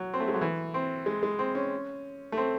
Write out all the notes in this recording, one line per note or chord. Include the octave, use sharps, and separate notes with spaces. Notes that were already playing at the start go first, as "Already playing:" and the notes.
Already playing: F#3
C4
A3
G#3
F#3
E3
C4
G#3
G#3
C4
C#4
A3
C4